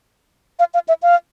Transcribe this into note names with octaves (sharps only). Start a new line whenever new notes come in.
F5
F5
E5
F5